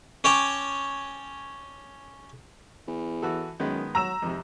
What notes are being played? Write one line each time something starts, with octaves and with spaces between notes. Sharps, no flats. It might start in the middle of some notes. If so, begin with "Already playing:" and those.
C#4 C#5 G5 A5 D6
E2
E3 F#4 A4
F#2 D#3 G#3 B3
F#3 A#5 E6 E7
G#1 F2 C3